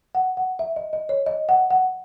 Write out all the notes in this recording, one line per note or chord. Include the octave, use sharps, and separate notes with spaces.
F#5
F#5
E5
D#5
D#5
C#5
D#5
F#5
F#5